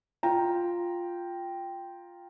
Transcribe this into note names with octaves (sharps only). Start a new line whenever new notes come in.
F4 G5 A#5